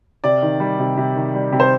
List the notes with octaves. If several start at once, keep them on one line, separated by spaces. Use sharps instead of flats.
C3 D5
D#3
G3
C3
C3
D#3
G3
C3
C5